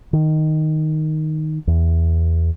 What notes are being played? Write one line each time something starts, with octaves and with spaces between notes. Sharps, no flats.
D#3
E2